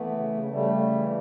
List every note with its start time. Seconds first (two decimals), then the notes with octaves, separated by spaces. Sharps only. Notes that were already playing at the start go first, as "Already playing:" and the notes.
Already playing: E3 A3 B3
0.11 C#3
0.32 C#3
0.51 C#3 G3 A3
0.70 C#3
0.90 E3